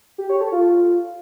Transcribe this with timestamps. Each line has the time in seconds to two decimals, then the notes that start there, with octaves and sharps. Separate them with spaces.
0.18 G4
0.30 C#5
0.41 A4
0.52 F4